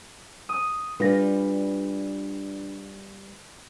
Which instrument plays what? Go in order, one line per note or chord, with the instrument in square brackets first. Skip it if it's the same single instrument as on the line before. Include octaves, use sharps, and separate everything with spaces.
[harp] D#6
[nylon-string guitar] G3 F4 B4 [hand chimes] D4 A#6